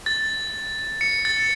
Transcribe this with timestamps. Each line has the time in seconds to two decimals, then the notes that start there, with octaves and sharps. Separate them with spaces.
0.06 A6
1.01 C#7
1.25 A6